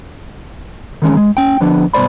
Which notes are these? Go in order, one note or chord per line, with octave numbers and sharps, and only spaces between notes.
D#3 E3 G#3 C#4
G#3
C#4 G5
D3 F3 B3 D4
G2 B2 C4 C5 D5 B5